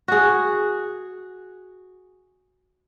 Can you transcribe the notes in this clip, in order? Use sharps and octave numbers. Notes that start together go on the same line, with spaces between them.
F#4 G#4